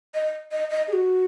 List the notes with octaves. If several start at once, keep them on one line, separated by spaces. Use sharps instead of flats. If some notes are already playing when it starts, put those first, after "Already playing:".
D#5
D#5
D#5
G#4
F#4